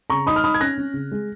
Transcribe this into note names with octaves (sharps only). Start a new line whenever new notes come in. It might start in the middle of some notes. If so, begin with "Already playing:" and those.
C#3 A#5 C#6
D#4 B5 D#6
F6
D#4 B5 D#6
G#6
C#4 F#6 A#6
C#4
C#3
G#3